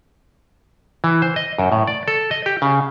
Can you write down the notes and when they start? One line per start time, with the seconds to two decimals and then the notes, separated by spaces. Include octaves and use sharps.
1.04 E3
1.22 C5
1.36 D#5
1.58 F#2
1.72 A2
1.87 D5
2.08 A4
2.31 D#5
2.46 G4
2.62 C#3